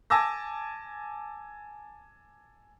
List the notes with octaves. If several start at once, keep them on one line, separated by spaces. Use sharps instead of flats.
G#5 A5 D6 E6 A#6